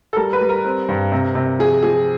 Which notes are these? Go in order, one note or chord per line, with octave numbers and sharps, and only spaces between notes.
A4
G3 A#4
B4
G3
A#4
C4
G2
C3
C3
F3 G#4
F3 G#4